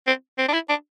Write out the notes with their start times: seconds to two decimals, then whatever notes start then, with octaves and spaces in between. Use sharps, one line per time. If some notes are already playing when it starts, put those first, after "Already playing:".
0.07 C4
0.38 C4
0.48 D4
0.53 E4
0.69 D4